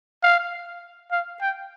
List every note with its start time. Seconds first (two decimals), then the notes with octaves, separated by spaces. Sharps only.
0.23 F5
1.11 F5
1.41 G5